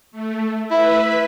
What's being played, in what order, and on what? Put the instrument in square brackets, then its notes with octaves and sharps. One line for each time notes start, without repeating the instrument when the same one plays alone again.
[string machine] A3
[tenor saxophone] E4 [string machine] B4 E5 B5